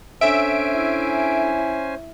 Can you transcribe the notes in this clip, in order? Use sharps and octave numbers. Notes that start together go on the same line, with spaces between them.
C#4 D4 A4 C5 C#5 E5 G#5 D7
E4